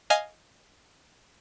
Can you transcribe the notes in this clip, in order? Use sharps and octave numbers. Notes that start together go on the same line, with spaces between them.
D#5 F5 G#5 C7